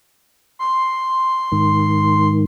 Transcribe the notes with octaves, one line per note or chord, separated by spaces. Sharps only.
C6
G#2 D#3